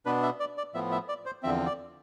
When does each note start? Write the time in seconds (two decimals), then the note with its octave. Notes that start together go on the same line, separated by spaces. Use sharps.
0.06 B2 B3 D4 B4
0.23 E5
0.40 D5
0.58 D5
0.74 A2 F3 B3 E5
0.92 E5
1.09 D5
1.26 C5
1.43 E2 D3 F3 C4 E5
1.66 D5